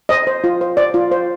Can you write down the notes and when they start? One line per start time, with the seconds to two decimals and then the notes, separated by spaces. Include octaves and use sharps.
0.09 C5 D#5
0.27 C5
0.44 F4
0.61 C5
0.77 C5 D5
0.94 F4
1.11 C5